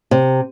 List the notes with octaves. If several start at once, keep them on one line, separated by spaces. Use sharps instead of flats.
C3